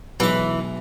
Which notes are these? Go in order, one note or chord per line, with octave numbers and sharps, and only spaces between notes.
B1 E3 G#3 D6